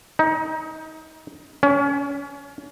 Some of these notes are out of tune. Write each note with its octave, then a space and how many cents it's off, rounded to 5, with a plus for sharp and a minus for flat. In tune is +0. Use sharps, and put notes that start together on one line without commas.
D#4 +25
C#4 +30